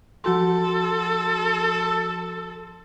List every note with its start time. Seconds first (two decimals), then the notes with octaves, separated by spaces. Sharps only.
0.24 F3 F#4 A4 C6